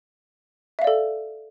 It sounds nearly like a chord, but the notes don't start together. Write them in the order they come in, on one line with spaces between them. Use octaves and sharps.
E5 F5 D5 A4